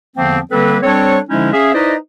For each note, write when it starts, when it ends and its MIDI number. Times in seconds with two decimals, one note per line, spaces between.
0.16 0.39 40
0.16 0.39 50
0.16 0.39 53
0.16 0.39 58
0.16 0.39 60
0.51 0.78 50
0.51 0.78 55
0.51 0.78 58
0.51 0.78 60
0.51 0.78 69
0.51 0.78 71
0.83 1.18 55
0.83 1.18 60
0.83 1.18 62
0.83 1.18 69
0.83 1.18 73
1.29 1.52 50
1.29 1.52 53
1.29 1.52 56
1.29 1.52 61
1.29 1.52 63
1.29 1.52 64
1.53 1.72 61
1.53 1.72 68
1.53 1.72 76
1.53 1.72 77
1.74 1.95 63
1.74 1.95 64
1.74 1.95 71
1.74 1.95 72
1.74 1.95 74
1.74 1.95 75